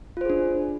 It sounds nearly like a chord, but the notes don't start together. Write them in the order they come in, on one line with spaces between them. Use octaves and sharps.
F4 C5 G#4 D4